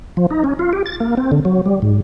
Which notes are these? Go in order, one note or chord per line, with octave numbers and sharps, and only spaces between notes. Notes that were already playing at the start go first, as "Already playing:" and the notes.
F3
D#4
C#4
F4
G4
A6
A#3
C4
D3
F#3
G3
G#2